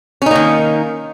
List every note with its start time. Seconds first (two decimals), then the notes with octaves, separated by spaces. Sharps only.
0.22 C#4
0.26 D#4
0.31 A#3
0.35 D#3